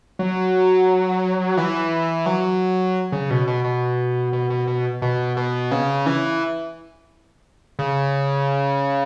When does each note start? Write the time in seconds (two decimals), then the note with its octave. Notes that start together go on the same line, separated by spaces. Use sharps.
0.19 F#3
1.57 E3
2.26 F#3
3.12 C#3
3.30 B2
3.47 B2
3.64 B2
4.33 B2
4.50 B2
4.67 B2
5.02 B2
5.37 B2
5.71 C#3
6.06 E3
7.79 C#3